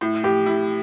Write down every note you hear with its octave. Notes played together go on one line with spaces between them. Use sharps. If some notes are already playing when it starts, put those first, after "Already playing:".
A2
A2 G4
E4